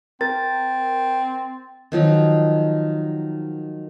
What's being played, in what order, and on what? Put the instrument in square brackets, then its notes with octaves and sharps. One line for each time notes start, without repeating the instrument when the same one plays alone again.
[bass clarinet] C4 [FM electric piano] A#4 [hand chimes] A6
[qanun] D#3 F3 F#3 D#4